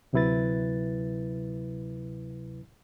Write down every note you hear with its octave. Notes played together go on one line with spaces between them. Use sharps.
D2 C3 F#3 E4 B4 A6